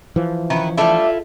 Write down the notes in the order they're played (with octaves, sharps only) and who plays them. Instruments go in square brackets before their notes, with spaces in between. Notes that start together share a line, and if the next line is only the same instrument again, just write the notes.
[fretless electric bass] E3 F3
[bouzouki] D#3 E4 B4 [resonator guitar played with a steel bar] C#4
[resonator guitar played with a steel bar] G3 A3 D4 [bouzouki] E4 F4 A4 [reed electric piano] E5